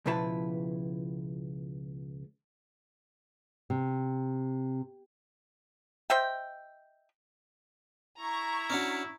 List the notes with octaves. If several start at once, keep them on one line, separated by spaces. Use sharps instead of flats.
C#2 B2 F3 E4 B4 A5
C3
C5 D#5 E5 G5
E4 A#5 C#6
C#4 D4 F#4